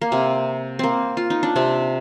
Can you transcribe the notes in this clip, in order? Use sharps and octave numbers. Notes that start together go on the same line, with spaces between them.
A#3
C3 C4
A#3 C4
F4
D#4
D4
C3 C4